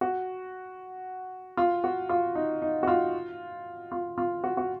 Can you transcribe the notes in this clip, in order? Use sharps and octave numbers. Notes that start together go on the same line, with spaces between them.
F#4
F4
F#4
F4
D#4
D#4
F#4
F4
F4
F4
F#4
F#4